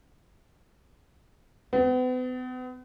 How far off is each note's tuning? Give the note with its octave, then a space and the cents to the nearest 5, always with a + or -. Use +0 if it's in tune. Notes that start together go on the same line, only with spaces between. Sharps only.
B3 +40